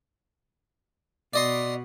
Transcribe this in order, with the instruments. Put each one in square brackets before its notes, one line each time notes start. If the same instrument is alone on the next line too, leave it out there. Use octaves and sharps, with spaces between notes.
[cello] B2 [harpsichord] D5 D#5 C6